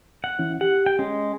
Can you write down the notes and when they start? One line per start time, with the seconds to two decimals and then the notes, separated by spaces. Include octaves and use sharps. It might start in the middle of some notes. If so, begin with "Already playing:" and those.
0.24 F#5
0.39 E3 C#4 E4
0.61 G4 F#5
0.86 G5
0.99 G#3 C#4